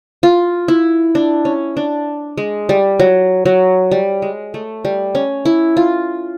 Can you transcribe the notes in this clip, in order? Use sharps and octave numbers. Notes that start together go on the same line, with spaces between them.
F4
E4
D4
C#4
D4
G#3
G3
F#3
F#3
G3
G#3
A3
G3
C#4
E4
F4